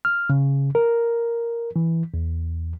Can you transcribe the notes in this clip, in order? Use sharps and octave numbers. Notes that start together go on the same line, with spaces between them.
F6
C#3
A#4
E3
E2